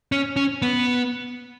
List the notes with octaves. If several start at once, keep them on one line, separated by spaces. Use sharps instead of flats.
C#4
C#4
B3